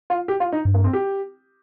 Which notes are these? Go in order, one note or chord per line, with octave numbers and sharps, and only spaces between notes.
F4
G4
F4
D#4
G2
A#3
C4
G4